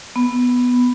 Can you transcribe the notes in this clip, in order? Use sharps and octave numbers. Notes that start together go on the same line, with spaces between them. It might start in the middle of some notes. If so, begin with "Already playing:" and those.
B3